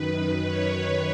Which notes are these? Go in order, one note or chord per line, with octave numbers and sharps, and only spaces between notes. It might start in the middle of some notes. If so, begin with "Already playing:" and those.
Already playing: F#2 D#3 B4
C#5